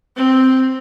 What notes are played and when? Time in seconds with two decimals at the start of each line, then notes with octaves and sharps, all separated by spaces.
0.16 C4